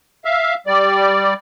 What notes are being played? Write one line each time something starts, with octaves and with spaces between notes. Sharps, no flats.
E5 F5
G3 D5